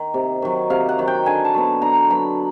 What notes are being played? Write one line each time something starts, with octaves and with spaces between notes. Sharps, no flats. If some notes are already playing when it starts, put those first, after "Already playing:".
Already playing: D#3
C3
D#3 F#3
C3 F5
F#5
D#3 F#3
G5
D3 G#5
A5
F#3 B3
D3 A#5
F#3 B3 B5